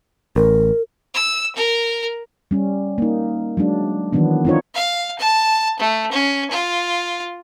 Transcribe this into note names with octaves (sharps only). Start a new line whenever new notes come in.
A1 A#4
E6
A#4
G3 C#4
A#3 D#4
F#3 G#3 D4
D#3 E3 F#3 B3 D4
C4 D4 D#4 F4 C#5
F5
A5
A3
C#4
F4